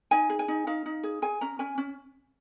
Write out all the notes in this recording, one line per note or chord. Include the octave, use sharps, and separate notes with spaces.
D#4 G#5
G#4
G#5
D#4
D#4 F5
D#4
G#4
G#4 G#5
C#4 A#5
C#4 G#5
C#4